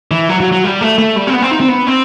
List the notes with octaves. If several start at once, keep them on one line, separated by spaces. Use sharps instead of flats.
E3
F#3
F#3
F#3
G3
A3
A3
G3
C4
B3
C4
D#4
C4
B3
C4